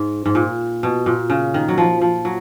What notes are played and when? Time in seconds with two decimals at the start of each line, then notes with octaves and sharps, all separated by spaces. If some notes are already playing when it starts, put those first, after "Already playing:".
Already playing: G#2
0.26 G#2
0.35 A#2
0.83 B2
1.06 A#2
1.30 C#3
1.54 D#3
1.68 F#3
1.78 F3
2.02 F3
2.25 F#3